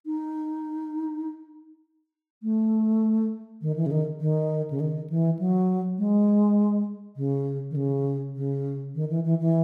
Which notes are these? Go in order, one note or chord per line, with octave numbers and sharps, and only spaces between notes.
D#4
A3
D#3
E3
C#3
D#3
D#3
C#3
D#3
E3
F#3
G#3
C#3
D#3
C#3
C#3
D#3
E3
E3
E3